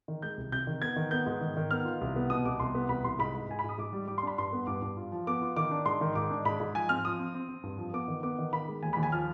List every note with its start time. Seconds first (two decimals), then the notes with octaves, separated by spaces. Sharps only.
0.08 D#3
0.22 G#3 G6
0.37 C2
0.52 C3 G6
0.67 D#3
0.82 B3 G#6
0.96 D#3
1.11 B3 G6
1.26 G#2
1.41 D#3
1.57 D#3
1.71 B3 F6
1.85 F4
2.01 C2
2.16 B3
2.30 B2 D#6
2.45 C2 D6
2.60 C2 C6
2.75 B3
2.89 C2 B5
3.04 C2 C6
3.19 G#2 B5
3.35 G#2
3.49 G#2 G#5
3.59 B5
3.64 G#2 D#6
3.78 G#2 D6
3.93 G3
4.08 G3 D6
4.18 C6
4.23 D4 B5
4.38 G2 C6
4.53 B3
4.67 G2 D6
4.82 G2
4.97 F4
5.12 F3
5.27 B3 D6
5.42 F4
5.56 D#3 D6
5.71 D4
5.85 G#2 C6
6.01 D#3
6.15 G#2 D6
6.31 D4
6.45 G#2 B5
6.60 G#2
6.75 F3 G#5
6.89 C4 F6
7.05 F3 D#6
7.19 C4
7.34 C4
7.49 C4
7.63 G2
7.78 F3
7.93 B3 D6
8.08 D#3
8.23 B3 D6
8.39 D#3
8.53 D#3 B5
8.68 G#3
8.83 D#2 G#5
8.93 D#2 B5
9.03 G#5
9.12 F3 F6